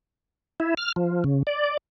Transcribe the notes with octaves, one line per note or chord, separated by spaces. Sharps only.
E4
F6
F3
C#3
D5